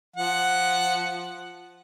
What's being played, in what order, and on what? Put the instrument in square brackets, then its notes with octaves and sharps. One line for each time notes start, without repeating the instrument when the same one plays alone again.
[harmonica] F3 F#5